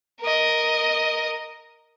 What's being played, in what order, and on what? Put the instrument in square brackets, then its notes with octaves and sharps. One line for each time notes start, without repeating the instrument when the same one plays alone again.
[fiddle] A#4 D#5